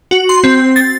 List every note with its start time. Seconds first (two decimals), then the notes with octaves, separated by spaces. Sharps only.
0.11 F#4
0.29 C6
0.44 C4
0.76 A6